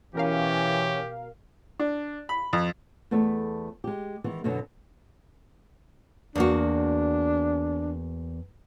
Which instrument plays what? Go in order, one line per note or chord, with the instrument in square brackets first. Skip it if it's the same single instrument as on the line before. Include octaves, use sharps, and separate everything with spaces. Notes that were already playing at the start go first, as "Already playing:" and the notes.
[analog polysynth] B2 A#4 F5 [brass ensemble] E3 [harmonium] C#4 [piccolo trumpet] G4
[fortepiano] D4
B5
F2
[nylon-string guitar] E2 A3 B3 D5 E5
G#3 G4
D#3 E3 G#3 B3
F#2 B2 D3 F#3 B3
[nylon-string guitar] E2 A#3 F#4 [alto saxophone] D4